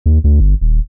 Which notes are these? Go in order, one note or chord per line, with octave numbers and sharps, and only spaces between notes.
D#2
D2
G1
D#1